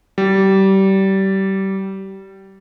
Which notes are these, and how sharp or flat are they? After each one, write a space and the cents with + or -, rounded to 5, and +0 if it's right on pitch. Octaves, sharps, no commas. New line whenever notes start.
G3 -25